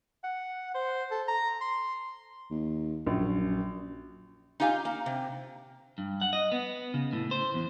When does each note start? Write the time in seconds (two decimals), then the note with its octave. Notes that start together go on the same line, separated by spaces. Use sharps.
0.24 F#5
0.74 C5
1.11 A4
1.28 A#5
1.61 C6
2.50 D#2
3.07 A#1 F#2
4.60 D#4 F4 G4 F5 G#5
4.85 A#3
5.06 C3
5.98 G2
6.21 F#5
6.33 D#5
6.52 B3
6.94 C#3
7.13 A2
7.31 C5
7.54 E2